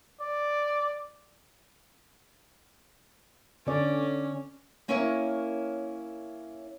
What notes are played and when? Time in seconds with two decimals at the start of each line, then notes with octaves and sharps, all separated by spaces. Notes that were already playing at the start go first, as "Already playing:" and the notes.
0.21 D5
3.67 D3 C#4 D5
4.88 A#3 C#4 E4 A#4 C#5 E5